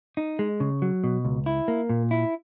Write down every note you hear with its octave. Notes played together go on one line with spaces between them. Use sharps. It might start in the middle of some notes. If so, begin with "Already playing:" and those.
D#4
G#3
C#3
F#3
B2
C#2
E4
A#3
A#2
E4